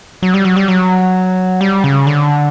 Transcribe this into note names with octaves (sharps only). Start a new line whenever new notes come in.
F#3
G3
F#3
G3
F#3
G3
C#3
D3